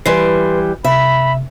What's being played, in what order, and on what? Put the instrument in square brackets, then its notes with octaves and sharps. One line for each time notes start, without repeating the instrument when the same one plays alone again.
[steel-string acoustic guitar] E3 G3 [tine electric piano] B4 C6 C7
[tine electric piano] C3 [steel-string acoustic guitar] E5 [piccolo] B5